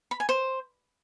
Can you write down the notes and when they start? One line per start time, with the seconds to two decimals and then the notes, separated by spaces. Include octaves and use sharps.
0.11 B5
0.20 G#5
0.29 C5